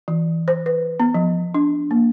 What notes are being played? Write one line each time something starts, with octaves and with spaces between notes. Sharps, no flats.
E3
C5
B4
B3
F3
D4
A#3